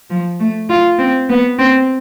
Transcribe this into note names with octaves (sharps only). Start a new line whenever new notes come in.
F3
A3
F4
C4
B3
C4